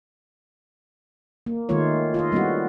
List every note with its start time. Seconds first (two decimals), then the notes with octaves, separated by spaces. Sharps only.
1.46 A#3
1.69 D#3 G#3 A3 F4 C#5
2.14 F4 A4 D#5
2.32 G3 G#3 B3 C#4 E4 F#4